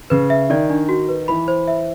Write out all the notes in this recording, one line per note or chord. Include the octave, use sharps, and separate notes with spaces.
C#3 B4
E5
D#3 D5
D4
F#4
B4
E3 B5
C5
E5